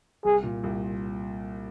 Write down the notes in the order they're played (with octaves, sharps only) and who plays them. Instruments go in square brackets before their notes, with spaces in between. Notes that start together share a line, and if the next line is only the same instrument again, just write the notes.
[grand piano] C2 [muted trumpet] G#4
[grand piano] A#2
C2